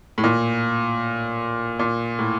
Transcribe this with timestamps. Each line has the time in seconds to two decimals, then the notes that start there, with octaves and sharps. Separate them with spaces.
0.18 A2
0.24 A#2
1.79 A#2
2.19 A2